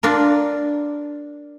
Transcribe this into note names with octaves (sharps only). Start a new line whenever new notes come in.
D4 F4 A#4